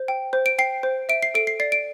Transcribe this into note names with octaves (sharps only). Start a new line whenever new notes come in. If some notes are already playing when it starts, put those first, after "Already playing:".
Already playing: C5
G5
C5
D7
G5 C7
C5
E5 D7
C7
A4 D7
C7
D5 C7
D7